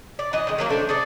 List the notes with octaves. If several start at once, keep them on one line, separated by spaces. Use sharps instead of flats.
D5
E3 F#3 D#5
D#3 G#3
D#3 F#3 A#3
A3 C4 D4
G#4 A4 D5